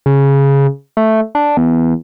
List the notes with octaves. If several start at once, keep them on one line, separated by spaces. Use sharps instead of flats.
C#3
A3
D4
E2